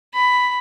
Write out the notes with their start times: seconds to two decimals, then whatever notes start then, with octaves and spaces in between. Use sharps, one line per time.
0.14 B5